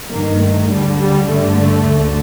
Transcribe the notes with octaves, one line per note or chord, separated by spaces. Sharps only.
G2 D#3 A#3
A3
D2 D3 G3
G3
G2 D3 A3
A3
D2 D3